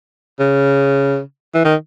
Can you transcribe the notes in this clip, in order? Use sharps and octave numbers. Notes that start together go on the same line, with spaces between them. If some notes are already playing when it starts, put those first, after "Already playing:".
C#3
E3
D#3